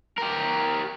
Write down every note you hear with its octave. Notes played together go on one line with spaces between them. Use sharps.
G4 A#4